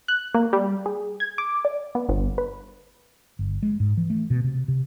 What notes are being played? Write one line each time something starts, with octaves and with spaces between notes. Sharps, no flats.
F#6
A#3
G3
G#4
G#6
D6
D5
B3
G1
B4
G1
G#3
G#2
E3
A3
B2
C3
C3